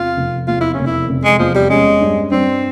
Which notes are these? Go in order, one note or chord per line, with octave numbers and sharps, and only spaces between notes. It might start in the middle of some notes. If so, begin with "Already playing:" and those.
Already playing: E2 C3 F4
F1
E2 F4
E4
C#4
F1
E4
F1
G#3
E2 F3
G3
G#3 C#4
G2
G2 C4